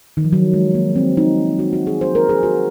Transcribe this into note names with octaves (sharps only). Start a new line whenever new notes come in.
D#3
F3
F#3
G#3
A#3
C4
D#4
F#4
F#4
G#4
C5
A#4
G#4
F#4